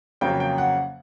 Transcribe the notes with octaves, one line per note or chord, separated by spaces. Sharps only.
F2 C#3 F#3 A#3 G5
G5
F#5